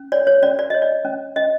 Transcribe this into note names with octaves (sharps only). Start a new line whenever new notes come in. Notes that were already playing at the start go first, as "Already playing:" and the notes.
Already playing: C#4
C#5 D5
C#5
C#4 D5
D5
C#5 D#5
D5
C#4
C#4 D#5